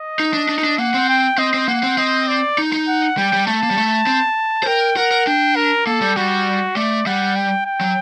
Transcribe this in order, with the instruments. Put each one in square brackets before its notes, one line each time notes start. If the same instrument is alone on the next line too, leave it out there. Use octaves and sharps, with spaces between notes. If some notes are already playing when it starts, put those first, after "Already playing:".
Already playing: [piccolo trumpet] D#5
[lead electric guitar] D#4
D4
D4
D#4
D4
[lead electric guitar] A#3 [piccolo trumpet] F#5
[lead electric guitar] C4
[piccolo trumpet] G5
[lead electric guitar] C4 [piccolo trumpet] D#5
[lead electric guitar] C4
[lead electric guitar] A#3 [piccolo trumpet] F#5
[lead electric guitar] C4
[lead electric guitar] C4 [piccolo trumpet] D#5
[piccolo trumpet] D5
[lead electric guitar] D#4
D#4
[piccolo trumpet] F#5
[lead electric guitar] G3 [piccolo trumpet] G5
[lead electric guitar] G3
[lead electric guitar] A3 [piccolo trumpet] A5
[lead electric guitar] A#3
G3
A3
C4
C5
[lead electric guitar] A#4 [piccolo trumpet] G5
[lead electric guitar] A#4 [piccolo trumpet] F#5
[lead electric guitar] A#4
[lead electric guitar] D4 [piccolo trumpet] G5
[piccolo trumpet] A#4
[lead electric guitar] A#3 [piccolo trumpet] A4
[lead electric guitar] G3
[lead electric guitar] G3 [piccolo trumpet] F#4
[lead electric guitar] A3 [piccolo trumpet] D5
[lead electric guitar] G3 [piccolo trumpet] F#5
[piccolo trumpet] G5
G5
[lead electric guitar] F#3